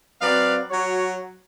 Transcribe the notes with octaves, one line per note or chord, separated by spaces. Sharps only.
F#3 C4 B4 D5 F5
F#3 F#4 C#5